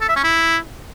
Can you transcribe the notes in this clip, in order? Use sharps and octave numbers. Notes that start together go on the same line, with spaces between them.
A4
E5
C#4
E4